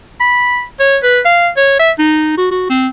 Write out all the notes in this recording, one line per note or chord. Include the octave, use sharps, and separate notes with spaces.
B5
C#5
B4
F5
C#5
E5
D#4
F#4
F#4
C4